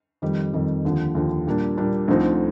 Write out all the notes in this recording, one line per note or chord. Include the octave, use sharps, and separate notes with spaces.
F2 D#3 G3
F2 D#3 G3
D#2 D3 F3
D#2 D3 F3
A#2 G3 A#3 D4
A#2 G3 A#3 D4
D2 D3 F3 C4 D#4